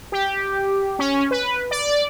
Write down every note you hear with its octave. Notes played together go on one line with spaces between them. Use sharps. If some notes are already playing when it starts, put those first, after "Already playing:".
G4
C#4
B4
D5